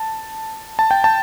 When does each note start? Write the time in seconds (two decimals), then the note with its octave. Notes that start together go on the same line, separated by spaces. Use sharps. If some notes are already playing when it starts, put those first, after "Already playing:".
Already playing: A5
0.79 A5
0.91 G5
1.04 A5